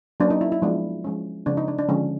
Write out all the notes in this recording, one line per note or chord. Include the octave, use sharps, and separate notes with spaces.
F#3 A#3 C#4 D4
D#4
E4
E4
F3 G#3 B3 D4
F3 G#3 C#4
C#3 F3 G#3 C4 D4
D#4
D4
D4
D3 F3 G#3 C#4